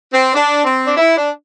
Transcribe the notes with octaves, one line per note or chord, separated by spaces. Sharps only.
C4
D4
C4
D4
E4
D4